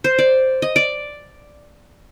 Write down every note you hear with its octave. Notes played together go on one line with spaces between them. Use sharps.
C5
D5
D#5
D5